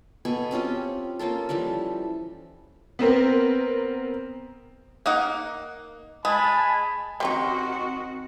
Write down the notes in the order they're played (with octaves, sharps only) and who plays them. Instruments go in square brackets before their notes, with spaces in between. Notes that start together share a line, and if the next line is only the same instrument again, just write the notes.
[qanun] B2 B3 A4 G#5
C4 C#4 F4 G4
A#3 C#4 F4 A4
E3 F3 G3 A4
[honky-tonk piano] B3 C4 A#4
[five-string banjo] A#3 D#4 F#5
[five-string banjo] G#3 [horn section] G#5 A5 B5
[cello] D#3 F#4 [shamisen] G3 C#4 D#4 [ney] C4 [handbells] C6